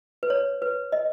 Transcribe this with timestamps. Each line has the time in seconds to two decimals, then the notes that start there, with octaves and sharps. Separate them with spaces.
0.23 B4
0.30 C#5
0.62 B4
0.92 D#5